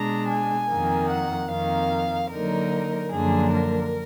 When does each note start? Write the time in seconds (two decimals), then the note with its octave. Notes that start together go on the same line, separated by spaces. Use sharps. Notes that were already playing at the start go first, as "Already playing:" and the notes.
Already playing: B2 G#3 D4 A#5
0.30 G#5
0.70 F2 D#3 A#3
1.10 F#5
1.51 F2 D#3 A#3 F5
2.31 D3 F#3 A#3 D#4 A#4
3.12 F#2 D3 F3 A#3 D4 G#4
3.52 A#4